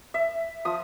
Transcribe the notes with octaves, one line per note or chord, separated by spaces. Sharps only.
E5
F3 D#6